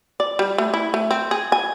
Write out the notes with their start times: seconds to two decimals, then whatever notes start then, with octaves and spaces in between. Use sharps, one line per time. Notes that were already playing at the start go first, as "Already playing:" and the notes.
0.20 D5
0.39 G3
0.58 A3
0.74 E4
0.94 A3
1.11 C4
1.31 G#4
1.52 G#5